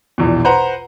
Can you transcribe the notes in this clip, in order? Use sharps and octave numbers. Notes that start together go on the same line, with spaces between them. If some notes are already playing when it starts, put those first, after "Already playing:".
A#1 E2 B2
B4 C5 F#5 A#5